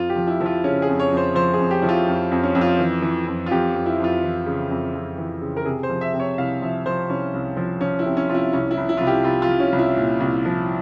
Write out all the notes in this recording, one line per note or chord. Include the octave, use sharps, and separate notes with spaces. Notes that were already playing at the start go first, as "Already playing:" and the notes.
Already playing: F2 F4
G4
F3
E4
F3 E4
F4
C#3 C#4
G#4
F2
C#5
F2
C5
F3 C5
G#4
F2
G4
F3 E4
F4
F2
F2
C#4
F2
F4
E3
E3
F2
F4
F2 G4
F2
E4
F2 F4
E3
C#3
F2
F2
E3
C#3
A#4
C3 G#4
C5
F3
E5
C3
C#5
C2 F5
F3 E5
F3 C5
C2 C#4
C2
F3
F3 C#4
E4
C3
C#4
C3 F4
E4
C2 C#4
E4
C2
E4
C2 F4
G4
C2 F4
F4
C2
C#4
C2
E4
A#2
C2
F3